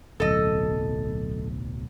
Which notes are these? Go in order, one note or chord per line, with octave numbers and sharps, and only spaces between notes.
D1 B1 A4 D#5